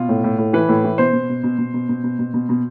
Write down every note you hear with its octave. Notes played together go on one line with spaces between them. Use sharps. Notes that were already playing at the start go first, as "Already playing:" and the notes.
Already playing: B2 F4
A2
A2
A2
E3 B4
A2
E3
B2 C5
B2
B2
B2
B2
B2
B2
B2
B2
B2
B2